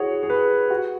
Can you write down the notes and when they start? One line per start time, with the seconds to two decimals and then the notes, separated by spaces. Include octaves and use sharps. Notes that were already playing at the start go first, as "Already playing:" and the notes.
Already playing: E4 F#4 G#4 C#5
0.23 G#4
0.30 B4
0.70 F#4